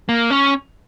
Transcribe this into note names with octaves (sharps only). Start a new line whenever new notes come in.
A#3
C#4